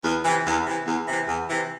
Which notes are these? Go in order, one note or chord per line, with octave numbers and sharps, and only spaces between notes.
E2
C3 E3
E2
C3 E3
E2
C3 E3
E2
C3 E3